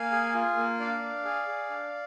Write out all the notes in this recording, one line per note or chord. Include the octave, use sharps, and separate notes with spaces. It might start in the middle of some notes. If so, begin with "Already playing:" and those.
Already playing: A#3 F5 G#5
G#4
F4
A#3
D4 D5 F5
D4
G#4
G#4
D4